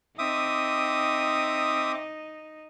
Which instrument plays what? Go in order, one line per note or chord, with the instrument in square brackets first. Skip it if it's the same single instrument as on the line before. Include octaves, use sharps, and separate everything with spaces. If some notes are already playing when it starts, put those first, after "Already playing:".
[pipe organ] C4 D6 [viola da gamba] D#4 [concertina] E5 D#6